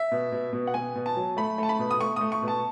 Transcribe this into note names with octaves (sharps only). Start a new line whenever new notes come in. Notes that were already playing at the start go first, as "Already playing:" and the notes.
Already playing: E5
B2
B2
B2
F#5
B2 G#5
B2
A5
F#3
A3 B5
A3 A5
B5
B2
D#6
A3 C#6
A3 D#6
C#6
B2
A5